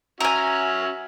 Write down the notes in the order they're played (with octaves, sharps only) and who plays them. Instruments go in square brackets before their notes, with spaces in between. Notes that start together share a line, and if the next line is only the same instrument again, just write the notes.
[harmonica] C#4 F#4 [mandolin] A#4 G#5 [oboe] E5